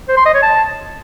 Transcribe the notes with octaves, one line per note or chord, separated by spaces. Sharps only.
C5
C6
D#5
C#5
A5